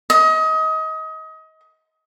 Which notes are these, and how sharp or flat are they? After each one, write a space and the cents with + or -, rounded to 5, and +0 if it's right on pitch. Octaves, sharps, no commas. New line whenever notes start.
D#5 +30